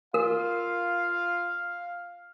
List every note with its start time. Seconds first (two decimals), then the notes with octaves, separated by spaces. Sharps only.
0.14 F4 A#4 F5